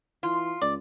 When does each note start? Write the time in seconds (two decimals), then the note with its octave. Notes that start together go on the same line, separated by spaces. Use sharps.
0.23 E3 F4
0.62 C#2 D5